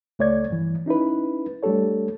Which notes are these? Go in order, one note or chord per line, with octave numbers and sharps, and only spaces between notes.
C#2 A3 C#5 D5 G#6
G2 E3
C#4 D#4 E4 B4
G3 A3 D4 G4 A4 C#5